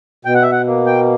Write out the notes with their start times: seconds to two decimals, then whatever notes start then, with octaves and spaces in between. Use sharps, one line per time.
0.25 B2 G5
0.35 F#5
0.42 E5
0.52 F#5
0.67 A#3
0.86 G5